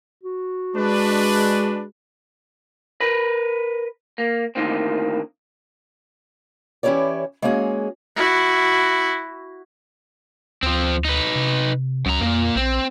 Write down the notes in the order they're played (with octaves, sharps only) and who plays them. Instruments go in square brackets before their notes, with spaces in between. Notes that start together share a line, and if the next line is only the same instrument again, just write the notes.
[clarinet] F#4
[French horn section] G#3 [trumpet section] D4 B4
[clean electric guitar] A#4 B4 B5
A#3
A2 D3 D#3 A#3 C4
[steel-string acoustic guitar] E3 C#4 E4 G4 C#5 D5
G#3 A#3 C#4 F#4 G#4
[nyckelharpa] E4 F#4
[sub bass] D2 [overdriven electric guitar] F3 C4
[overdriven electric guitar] D#4 B4
[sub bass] C3
[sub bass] C#2 [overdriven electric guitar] F#2 A#5
[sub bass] F2 [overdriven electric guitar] A#2 A#3
[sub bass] A#1 [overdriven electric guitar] C4